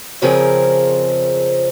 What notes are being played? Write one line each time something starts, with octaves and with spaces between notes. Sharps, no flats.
F2 C#3 F3 C4 G#4 A#4